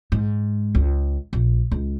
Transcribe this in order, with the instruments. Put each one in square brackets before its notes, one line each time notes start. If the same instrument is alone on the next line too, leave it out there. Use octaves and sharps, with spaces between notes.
[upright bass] G#2
C#2
A#1
C#2